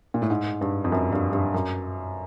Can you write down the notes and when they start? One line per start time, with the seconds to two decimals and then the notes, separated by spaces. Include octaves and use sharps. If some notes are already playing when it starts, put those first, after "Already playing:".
0.14 A#2
0.22 A2
0.30 G#2
0.61 G2
0.84 F2
0.92 F#2
1.12 G2
1.33 G2
1.54 F#2